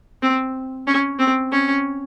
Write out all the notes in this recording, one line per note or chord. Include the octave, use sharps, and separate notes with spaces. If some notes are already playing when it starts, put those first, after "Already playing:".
C4
C#4
C4
C#4